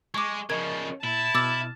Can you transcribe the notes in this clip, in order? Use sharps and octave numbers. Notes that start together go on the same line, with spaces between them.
G#3 C#6 D6
C#3 F3 A#4 D#5 C#6 G#6
A#2 E4 A5
B2 D6 E6 F6 A6